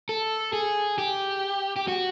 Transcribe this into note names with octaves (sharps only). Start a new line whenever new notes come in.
A4
G#4
G4
G4
F#4